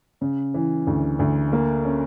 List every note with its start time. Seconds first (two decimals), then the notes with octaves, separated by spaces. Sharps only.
0.21 C#3
0.54 E3
0.87 D2
1.19 D2
1.52 A#3
1.85 C#4